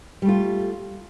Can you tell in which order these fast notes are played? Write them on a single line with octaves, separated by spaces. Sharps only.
G3 A3 F4